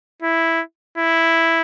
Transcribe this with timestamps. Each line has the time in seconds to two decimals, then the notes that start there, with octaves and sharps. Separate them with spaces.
0.22 E4
0.98 E4